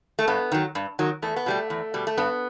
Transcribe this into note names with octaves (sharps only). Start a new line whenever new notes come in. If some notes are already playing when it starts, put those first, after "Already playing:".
A3
G2 B3
D#3 F#3
G2
D#3 F#3
E2 A3
B3
B2 G3 A3
E2
B2 G3
A3
G2 B3